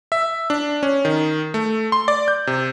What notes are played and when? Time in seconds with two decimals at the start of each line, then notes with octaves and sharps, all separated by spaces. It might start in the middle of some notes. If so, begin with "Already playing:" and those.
0.12 E5
0.50 D4
0.83 C#4
1.05 D#3
1.54 A3
1.92 C6
2.08 D5
2.28 G6
2.47 C3